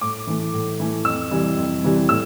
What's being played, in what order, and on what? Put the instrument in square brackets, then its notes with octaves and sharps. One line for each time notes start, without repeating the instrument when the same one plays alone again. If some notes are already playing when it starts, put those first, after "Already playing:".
[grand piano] A2 D6
E3 A3
A2
E3 A3
F2 E6
C3 E3 G3
F2
C3 E3 G3
A2 E6